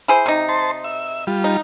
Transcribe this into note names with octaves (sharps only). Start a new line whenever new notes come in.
E4 G#4 C5
C3 D#4
C5 A5 C6
E5
G3 F4
D#4